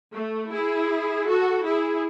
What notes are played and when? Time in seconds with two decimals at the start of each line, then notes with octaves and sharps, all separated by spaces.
0.13 A3
0.51 E4 G#4
1.27 F#4 A4
1.65 E4 G#4